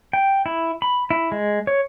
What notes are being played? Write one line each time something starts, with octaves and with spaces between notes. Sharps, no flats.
G5
E4
B5
E4
G#3
C#5